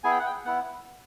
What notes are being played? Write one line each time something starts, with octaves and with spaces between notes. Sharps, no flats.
B3 E4 G#4 G#5
G5
F#5
G5
B3 E4 F#5